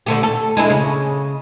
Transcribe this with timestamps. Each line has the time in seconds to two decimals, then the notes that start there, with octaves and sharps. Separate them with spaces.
0.06 D3 A3 G4
0.23 A4
0.57 G#3 D4 E4
0.70 C#3